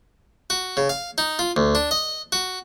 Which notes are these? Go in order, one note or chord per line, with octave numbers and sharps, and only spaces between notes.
F#4
C#3
F5
D#4
F4
D2
D4
D#5
F#4